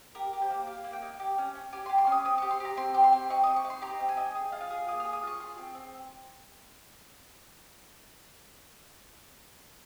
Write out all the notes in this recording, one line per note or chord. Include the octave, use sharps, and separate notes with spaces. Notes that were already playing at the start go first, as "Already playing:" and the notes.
G4 A#4
G4
C5
A#3
G4 F5
A#3
G5
D#4
G4
C#4
C#4
G4 G#5
C6
G4
C6
C#4
D#6
C4 D#6
G4 C#6
C6
G4 A#5
C4 C6
G4
C6
C4
D#4 C#6
C4 D#6
C#6
D#4
C6
G4 A#5
C4
G#5
D#4
G#4
F4
F5
G#4
A#3 D#6
F6
G#4
D#6
F4 C#6
G#4 C6
C4
C4